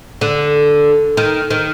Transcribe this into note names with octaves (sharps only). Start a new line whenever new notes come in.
D3
D#3
D#3